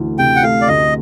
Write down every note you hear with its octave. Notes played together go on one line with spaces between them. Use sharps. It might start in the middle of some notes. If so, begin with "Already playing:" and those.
Already playing: D2 E3 A3
C3 G5
F#5
A3 F5
D5
D2 D#5